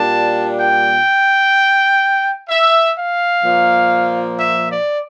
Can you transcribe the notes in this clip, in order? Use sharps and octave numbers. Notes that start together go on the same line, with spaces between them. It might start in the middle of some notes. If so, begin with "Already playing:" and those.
Already playing: A#2 G3 D4 A5
G5
E5
F5
A#2 F3 A#3
E5
D5